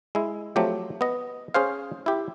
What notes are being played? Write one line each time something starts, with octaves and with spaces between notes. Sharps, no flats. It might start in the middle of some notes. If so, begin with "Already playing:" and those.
G#3 E4
F3 F#3 A3 C4 G4
B3 D#5
C#4 G#4 C5 F5
E4 G4